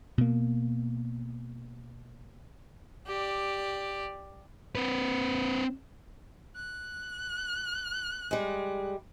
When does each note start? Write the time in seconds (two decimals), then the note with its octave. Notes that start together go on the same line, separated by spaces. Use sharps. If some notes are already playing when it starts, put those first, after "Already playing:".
0.18 B2 A#3
3.07 G4 D5
4.75 C4 B4
6.56 F#6
8.31 G3 G#3